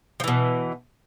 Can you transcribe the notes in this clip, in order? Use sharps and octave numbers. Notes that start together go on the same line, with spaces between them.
B2 E3 F3